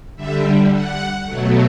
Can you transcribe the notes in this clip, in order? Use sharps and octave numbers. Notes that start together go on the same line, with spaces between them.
D3 G3 E5
F#5
B2 F#3 A3